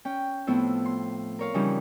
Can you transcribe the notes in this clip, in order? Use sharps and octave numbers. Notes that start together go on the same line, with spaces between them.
C#4 G5
A2 F3 B3 C4 E4
C6
A#4 C#5 F5
C#3 E3 F3 G3 C#4 D#4